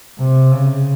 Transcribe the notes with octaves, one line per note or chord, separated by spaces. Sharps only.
C3
C#3